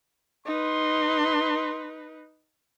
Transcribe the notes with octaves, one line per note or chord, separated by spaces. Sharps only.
D#4 B4 C6